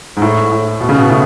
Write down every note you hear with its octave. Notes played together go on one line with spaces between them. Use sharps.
G#2
A2
A2
B2
C#3
B2
A2